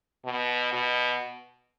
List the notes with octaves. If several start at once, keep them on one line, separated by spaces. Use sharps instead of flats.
B2
B2